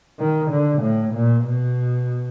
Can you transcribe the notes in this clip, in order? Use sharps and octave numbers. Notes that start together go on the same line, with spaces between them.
D#3
D3
A2
A#2
B2